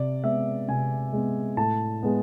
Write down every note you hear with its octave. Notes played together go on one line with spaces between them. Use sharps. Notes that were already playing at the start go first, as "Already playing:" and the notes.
Already playing: C3 D5
G#3 B3 E5
C3 G#5
G#3 B3
A2 A5
G#3 B3